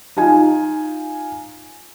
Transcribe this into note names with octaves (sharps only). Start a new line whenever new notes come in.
D#4 F4 G#5